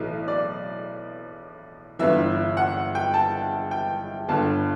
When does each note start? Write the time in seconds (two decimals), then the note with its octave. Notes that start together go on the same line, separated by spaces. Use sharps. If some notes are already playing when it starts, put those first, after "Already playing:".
Already playing: B1 A2 E3
0.28 D5
1.99 G1 G2 E3 E5
2.57 F#5
2.95 G5
3.14 A5
3.71 G5
4.29 G1 G2 D3 A5